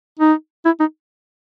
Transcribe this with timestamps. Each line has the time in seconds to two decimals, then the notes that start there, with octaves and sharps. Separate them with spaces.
0.19 D#4
0.65 E4
0.80 D#4